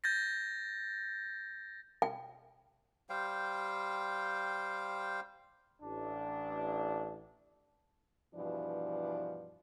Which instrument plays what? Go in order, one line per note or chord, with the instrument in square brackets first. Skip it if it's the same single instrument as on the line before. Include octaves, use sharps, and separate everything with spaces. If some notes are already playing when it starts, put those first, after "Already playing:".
[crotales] G6 A6 A#6
[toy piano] G5
[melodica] G3 C5 F5 G5
[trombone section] A1 D4
[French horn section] G2 B2 E3 F3 D4